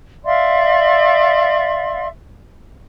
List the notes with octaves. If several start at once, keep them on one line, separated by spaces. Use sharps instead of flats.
D5 E5 F5 C6